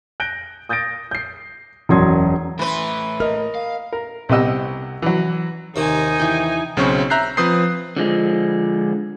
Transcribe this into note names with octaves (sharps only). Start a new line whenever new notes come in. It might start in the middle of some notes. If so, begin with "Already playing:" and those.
F#6 G6 A#6 D7 G7
D#6 G6 A6 A#6 D7
G6 C7
E1 F#2 F#3 C6 D#6 G#6
A2 E3 B4 B5 C6
A#4 D#5 F6
F5
A#4
C2 C3 B3 G4 D#5 E6
E3 F#3
D#2 C3 D#3 D#4 G#5
E3 G5
B1 C#3 C4 C#4 C5 C#6
E5 A#5 F#6 G6 C7
F3 C4 B4 D#6 G6 C7
D3 F3 G#3